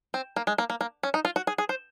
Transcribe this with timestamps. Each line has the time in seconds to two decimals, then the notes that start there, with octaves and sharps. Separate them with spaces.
0.14 C4
0.36 A#3
0.47 G#3
0.58 A#3
0.70 A#3
0.81 A#3
1.03 C#4
1.14 D#4
1.25 F4
1.36 F#4
1.47 G#4
1.58 G#4
1.69 C5